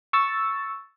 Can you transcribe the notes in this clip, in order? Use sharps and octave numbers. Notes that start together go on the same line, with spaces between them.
C#6 E6 A6